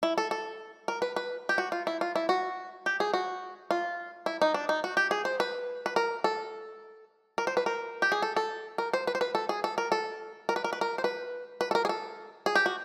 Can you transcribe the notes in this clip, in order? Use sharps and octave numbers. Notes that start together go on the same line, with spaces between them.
E4
A4
A4
A#4
B4
B4
G4
F#4
F4
E4
F4
E4
F#4
G4
G#4
F#4
F4
E4
D#4
D4
D#4
F#4
G4
G#4
C5
B4
B4
A#4
A4
A#4
C5
B4
A#4
G4
G#4
A4
A4
A#4
C5
B4
C5
B4
A4
G#4
A4
A#4
A4
A#4
B4
A#4
B4
A#4
C5
B4
B4
A4
A#4
G#4
A4
G#4
G4
F#4